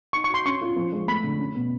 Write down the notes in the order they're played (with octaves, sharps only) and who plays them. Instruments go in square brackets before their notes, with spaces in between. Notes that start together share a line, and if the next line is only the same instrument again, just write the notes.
[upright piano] D#4 [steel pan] C#6
[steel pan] C#6
[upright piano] F#4
[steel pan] C6
[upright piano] C#4 [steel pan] C#6
[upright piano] F4
F3
G#3
[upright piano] A3 [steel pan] B5
[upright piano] D3
C#4
B2